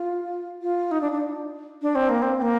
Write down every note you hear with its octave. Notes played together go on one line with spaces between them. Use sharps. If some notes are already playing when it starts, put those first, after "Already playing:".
Already playing: F4
F4
D#4
D4
D4
D4
C4
A#3
C4
C4
A#3